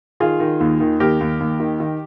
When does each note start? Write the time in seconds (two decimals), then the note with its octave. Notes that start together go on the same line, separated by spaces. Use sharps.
0.20 D#3 F4 G#4
0.40 D#3
0.60 D#2
0.80 D#3
1.00 D#2 G4 A#4
1.20 D#2
1.40 D#2
1.60 D#3
1.80 D#3